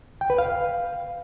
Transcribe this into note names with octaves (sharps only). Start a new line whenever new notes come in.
G5
B4
F5